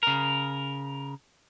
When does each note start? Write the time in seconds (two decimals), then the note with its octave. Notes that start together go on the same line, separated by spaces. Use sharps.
0.03 C#3 A#4